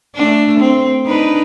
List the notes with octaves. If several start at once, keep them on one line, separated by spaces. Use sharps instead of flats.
A3 D4
C4
D4 D#4 B4